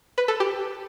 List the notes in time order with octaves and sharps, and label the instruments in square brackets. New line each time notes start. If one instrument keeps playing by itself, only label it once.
[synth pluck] B4
A4
G4